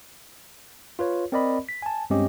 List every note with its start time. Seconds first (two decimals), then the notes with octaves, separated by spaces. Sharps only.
0.99 F4 B4 C#5
1.32 C4 A#4 D5 D#5 B5
1.69 B6
1.82 G#5 A5
2.10 G2 G#3 C4 C#4 G4 D#5